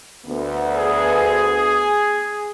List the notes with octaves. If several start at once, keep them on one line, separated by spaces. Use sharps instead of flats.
D2 B3
G#4